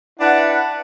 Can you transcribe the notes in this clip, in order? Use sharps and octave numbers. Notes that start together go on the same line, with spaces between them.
D4 E4 B4 F#5